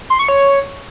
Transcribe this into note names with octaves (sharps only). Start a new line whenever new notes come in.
C6
C#6
C#5